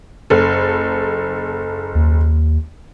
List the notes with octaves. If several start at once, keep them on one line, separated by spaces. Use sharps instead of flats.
F#1 A4
D#2